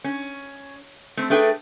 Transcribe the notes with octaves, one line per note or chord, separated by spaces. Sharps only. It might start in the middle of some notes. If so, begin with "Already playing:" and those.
C#4
A3 C4
A3 D4 G#4 A4 B4 G5